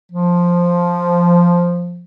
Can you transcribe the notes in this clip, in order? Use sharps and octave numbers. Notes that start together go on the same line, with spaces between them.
F3